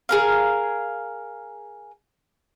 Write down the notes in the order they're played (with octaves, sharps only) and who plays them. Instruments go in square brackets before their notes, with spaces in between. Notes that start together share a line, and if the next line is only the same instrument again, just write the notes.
[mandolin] G#4 A#4 F5